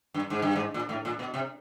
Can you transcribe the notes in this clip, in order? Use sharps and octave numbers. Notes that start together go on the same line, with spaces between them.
G2
G#2
G2
G#2
A#2
A2
A#2
B2
C3